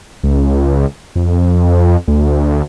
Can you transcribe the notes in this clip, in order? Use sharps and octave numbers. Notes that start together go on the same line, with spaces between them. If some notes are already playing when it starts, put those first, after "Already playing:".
C#2
F2
D2